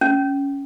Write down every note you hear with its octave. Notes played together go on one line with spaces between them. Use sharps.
C#4